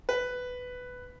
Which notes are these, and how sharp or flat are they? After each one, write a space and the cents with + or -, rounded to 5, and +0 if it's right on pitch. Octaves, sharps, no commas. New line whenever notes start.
B4 +10